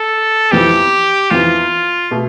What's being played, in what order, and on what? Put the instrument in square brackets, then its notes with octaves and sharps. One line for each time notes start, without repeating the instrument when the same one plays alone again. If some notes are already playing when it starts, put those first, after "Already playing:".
Already playing: [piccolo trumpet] A4
[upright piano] F2 E3 B3 [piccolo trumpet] G4
[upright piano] F2 E3 B3 [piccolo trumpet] F4
[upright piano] B2 A3